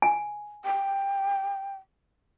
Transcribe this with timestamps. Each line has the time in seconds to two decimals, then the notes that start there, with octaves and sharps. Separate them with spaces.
0.02 G#5
0.65 G5